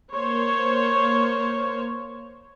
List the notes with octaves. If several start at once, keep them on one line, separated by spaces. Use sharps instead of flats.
A#3 C5 C#5